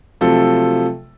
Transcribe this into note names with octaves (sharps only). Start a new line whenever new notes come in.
C3 F3 F#3 A3 F4 A4